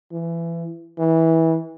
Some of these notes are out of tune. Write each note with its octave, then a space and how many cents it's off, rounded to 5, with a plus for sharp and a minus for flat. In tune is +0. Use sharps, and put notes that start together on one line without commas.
E3 +25
E3 -20